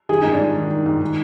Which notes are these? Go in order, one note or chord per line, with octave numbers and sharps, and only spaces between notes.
D#3 G#4
G#2 D#4
D4
G#2
D#3
D#3
G#2
D#3